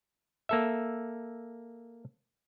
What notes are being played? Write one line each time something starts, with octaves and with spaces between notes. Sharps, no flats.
A#3 A4 E5